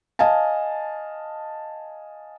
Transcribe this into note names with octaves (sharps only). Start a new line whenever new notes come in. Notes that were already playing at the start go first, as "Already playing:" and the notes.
D#5 F5 G#5 A5